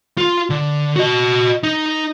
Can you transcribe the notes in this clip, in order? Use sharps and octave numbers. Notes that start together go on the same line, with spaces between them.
F4
D3
F#4 D#5
D#4